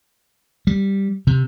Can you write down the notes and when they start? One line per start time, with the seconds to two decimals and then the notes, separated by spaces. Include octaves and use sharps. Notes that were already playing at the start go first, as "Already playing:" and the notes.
0.67 G3
1.27 C3